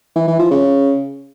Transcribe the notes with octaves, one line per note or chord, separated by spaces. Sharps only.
E3
E3
F3
C#3